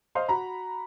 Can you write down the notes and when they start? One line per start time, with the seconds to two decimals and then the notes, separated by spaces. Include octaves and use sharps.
0.15 C5 D#5 F5 C6
0.28 F#4 A#5 B5